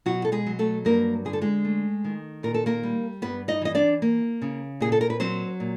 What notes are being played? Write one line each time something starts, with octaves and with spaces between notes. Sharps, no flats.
B2 F#3 F#4
A4
G#3 G#4
F#3
A3 A4
G2 A#3 A#4
D3 G#4
A4
G#3 G#4
A3
D#3
A#2 A#4
A4
A#3 A#4
G3
G2 B3 B4
D#4 D#5
E3 D#5
D4 D5
A#3
C#3
A#2 G#4
A4
A#4
B4
F#3 C4 C5
A#2